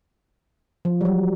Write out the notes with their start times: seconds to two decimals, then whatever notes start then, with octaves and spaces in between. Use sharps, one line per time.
0.85 F3
1.01 G3
1.05 F#3